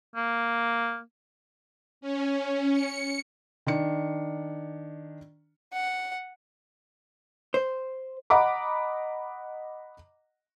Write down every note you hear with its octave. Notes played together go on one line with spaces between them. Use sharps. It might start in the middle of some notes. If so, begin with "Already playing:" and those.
A#3
C#4
C#7
D#3 D4 C#7
F#5
C5
D#5 F#5 A#5 B5 D6